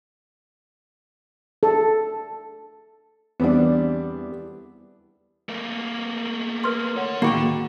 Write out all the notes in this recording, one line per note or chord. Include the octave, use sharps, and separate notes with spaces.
A4
E2 E3 G3 B3 C4 D4
A3 A#3
A#4 B4 C6
A4 C#5 F#5
D2 A2 D#3 A#3 F#4 G#4 G5 B5